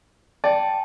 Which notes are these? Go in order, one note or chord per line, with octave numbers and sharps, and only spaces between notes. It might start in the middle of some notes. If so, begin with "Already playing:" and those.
D5 G5 A5